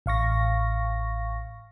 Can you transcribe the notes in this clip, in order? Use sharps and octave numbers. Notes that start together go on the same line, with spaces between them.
A1 F5 C#6 A#6